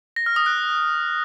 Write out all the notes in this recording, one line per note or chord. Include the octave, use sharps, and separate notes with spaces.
A#6
F6
D#6
F#6